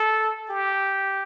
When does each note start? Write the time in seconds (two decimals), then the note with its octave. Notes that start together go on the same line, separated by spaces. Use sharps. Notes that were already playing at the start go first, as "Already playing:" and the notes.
Already playing: A4
0.50 G4